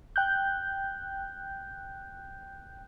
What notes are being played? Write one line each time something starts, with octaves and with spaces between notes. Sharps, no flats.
G5 F#6 G6